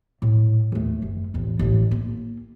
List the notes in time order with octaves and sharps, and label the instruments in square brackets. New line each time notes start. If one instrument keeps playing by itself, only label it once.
[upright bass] A2
D#2 A3
F#1
A1 E2
A1 D3
A#3